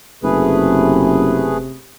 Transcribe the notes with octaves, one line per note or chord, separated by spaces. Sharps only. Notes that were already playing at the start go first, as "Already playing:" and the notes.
F#1 C3 A3 G#4 B4